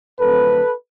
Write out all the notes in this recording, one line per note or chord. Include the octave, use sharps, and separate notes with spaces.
F2 D3 F#3 A3 C4 A4 B4